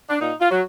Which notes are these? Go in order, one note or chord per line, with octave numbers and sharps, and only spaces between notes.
D4
A#2 D#4
F4
F#3